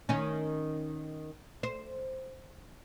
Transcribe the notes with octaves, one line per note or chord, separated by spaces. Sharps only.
D#3 C#4
C5